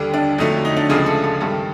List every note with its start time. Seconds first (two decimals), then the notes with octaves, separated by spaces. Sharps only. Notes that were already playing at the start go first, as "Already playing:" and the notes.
Already playing: D#2 D3 G3
0.14 D4
0.38 F2 D3 F#3 A3 D#4
0.65 D#4
0.77 D4
0.89 D2 C#3 F3 G#3 G#4
1.06 A4
1.24 A4
1.40 G2 D#3 G3 A4